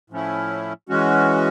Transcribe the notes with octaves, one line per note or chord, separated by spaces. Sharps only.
A2 F3 A3 C#4 E4
E3 G#3 C#4 F#4